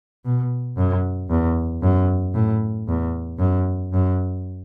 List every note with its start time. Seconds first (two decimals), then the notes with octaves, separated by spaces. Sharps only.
0.25 B2
0.77 F#2
1.30 E2
1.82 F#2
2.35 A2
2.88 E2
3.39 F#2
3.93 F#2